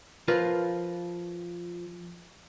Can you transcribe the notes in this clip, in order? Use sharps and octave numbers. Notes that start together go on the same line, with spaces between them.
F3 F4 A#4 B4